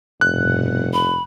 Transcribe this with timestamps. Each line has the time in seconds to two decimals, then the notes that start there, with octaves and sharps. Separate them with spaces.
0.21 F1 G2 B2 F#5 F#6
0.93 B5